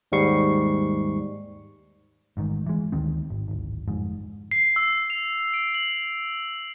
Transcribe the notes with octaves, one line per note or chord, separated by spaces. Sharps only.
D#2 G#2 G3 C#6 C7
A1 G#2 D#3
E3 G#3
D2 D3 D#3 C4
G#1
D1 G#1
G1 F2 G#2
C7
E6
F7
D7
F#7